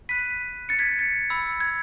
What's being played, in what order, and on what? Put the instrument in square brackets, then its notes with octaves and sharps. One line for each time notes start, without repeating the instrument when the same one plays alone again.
[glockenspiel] B5 F#6 B6 D#7
A6 C#7
G#6 B6
A6 C#7
B5 E6
G#6